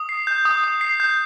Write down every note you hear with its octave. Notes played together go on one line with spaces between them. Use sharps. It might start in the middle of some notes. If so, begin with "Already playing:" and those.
Already playing: D#6
C7
G6
D#6
D#6
C7
G6